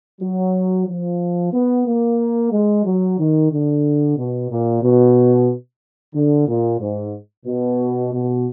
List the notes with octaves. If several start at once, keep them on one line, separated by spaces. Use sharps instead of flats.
F#3
F3
B3
A#3
G#3
F#3
D#3
D3
B2
A#2
B2
D3
A#2
G#2
B2
B2